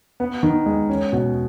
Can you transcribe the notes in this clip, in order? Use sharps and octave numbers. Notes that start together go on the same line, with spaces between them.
B3
D#3
G#3
C#4
B2